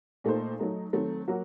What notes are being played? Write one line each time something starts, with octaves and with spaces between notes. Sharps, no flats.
A#2 A3 D#4 A4 C5
F#3 A3 D#4
D#3 F#3 A3 C4
F#3 A#3 F#4